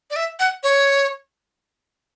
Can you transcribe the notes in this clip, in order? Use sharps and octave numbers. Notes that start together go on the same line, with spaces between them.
D5
E5
F#5
C#5